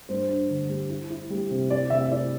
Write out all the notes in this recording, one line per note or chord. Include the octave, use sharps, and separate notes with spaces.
G2 C5
D4
D3
G3
E4
E4
G3
C3
E4 D5
C3 E5
E5
E4 D5